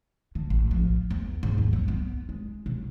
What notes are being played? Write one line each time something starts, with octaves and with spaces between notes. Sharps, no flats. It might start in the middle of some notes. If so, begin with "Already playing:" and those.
D3
A1
F3
E2
G#2
D#2
F#3
B3
G#3
B2